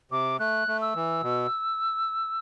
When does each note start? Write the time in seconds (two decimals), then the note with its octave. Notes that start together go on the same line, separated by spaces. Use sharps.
0.11 C3 D6
0.40 A3 F#6
0.68 A3
0.82 E6
0.95 E3
1.23 B2